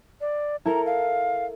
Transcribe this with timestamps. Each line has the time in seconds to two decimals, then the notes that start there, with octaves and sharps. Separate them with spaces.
0.21 D5
0.66 E4 A4 A#4 A#5
0.86 F5